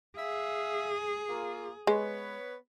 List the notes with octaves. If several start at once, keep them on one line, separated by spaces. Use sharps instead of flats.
G#4 E5 F5
A#3 F4
G#3 B3 B4 C#5